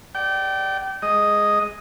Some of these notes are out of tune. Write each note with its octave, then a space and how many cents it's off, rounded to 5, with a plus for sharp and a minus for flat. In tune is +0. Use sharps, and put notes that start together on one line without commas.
D5 +0 G5 -30
G#3 +0 D#5 +0